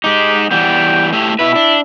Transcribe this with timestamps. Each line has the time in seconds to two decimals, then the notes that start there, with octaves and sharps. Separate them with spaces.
0.04 G#3 D#4 G4
0.51 E3 G3 B3 G5
1.13 A3 E4 G4
1.39 B2 E4 B4
1.55 D4